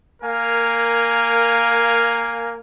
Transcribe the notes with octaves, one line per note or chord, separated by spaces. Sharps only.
A#3 A#4 F5 G#5